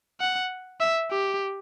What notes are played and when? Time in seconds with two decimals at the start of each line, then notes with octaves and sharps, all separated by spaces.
0.20 F#5
0.80 E5
1.11 G4